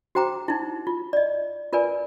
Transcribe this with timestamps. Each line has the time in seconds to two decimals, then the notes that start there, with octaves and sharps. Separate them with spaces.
0.15 F#4 C5 G5 A#5 D6
0.48 D#4 E4
0.87 F4
1.13 D5 D#5
1.73 F4 A#4 B4 D5 G#5